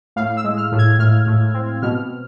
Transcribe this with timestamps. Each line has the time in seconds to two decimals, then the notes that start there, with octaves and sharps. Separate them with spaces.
0.16 A2 F5
0.37 E6
0.44 G#3
0.58 F6
0.72 A2
0.79 G#6
0.99 A2 F6
1.27 A2
1.54 C4
1.82 B2 F6